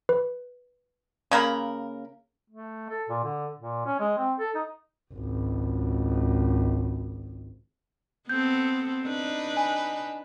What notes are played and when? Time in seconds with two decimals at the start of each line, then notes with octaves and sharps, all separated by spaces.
0.09 B4
1.31 C#3 A#3 A#4 B5
2.50 A3
2.89 A4
3.09 A#2
3.24 D3
3.58 A#2
3.86 C#4
4.00 G#3
4.18 C4
4.39 A4
4.55 D#4
5.13 G#1 C#2
8.29 B3 C4 A4 G6
9.05 D4 D#4 B4
9.57 G#5